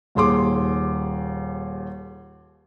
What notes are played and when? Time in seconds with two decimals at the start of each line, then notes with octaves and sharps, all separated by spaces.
0.15 D#1 D#2 G#4 C6 D6